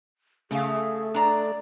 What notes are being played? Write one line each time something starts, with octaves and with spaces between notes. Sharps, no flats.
C#3 A3 G#4 F5
D4 D5 A#5